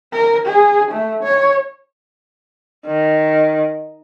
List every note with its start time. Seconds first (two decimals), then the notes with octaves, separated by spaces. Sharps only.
0.13 A#4
0.46 G#4
0.92 A3
1.24 C#5
2.87 D#3